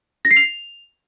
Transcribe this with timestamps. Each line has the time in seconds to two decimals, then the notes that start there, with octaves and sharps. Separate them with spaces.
0.25 A#6
0.31 C7
0.37 F7